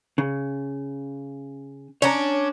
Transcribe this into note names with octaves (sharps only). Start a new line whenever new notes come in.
C#3
C#4 D4 C#5 A#5